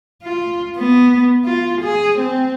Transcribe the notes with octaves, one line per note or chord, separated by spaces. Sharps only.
F4
B3
F4
G#4
C4